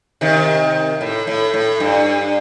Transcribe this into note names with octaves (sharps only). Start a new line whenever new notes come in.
C3 D#3
A2
A2
A2
G2